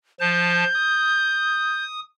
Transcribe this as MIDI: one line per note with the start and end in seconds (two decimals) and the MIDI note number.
0.20 0.64 53
0.20 0.64 81
0.20 1.85 91
0.75 2.00 87